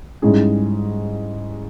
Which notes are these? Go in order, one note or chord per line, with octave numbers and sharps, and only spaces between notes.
G#2 G3 C#4 E4 G#4